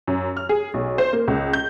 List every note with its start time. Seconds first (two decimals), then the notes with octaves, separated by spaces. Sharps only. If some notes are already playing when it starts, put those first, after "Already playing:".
0.07 F#2
0.37 F6
0.49 G#4
0.74 B1
0.98 C5
1.13 A#3
1.28 C#2
1.53 G6